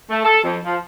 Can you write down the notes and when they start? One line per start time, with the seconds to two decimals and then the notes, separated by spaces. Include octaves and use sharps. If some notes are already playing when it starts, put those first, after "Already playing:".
0.11 A3
0.25 A4
0.44 F2
0.64 F3